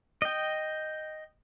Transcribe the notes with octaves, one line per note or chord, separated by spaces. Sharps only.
D#5 G5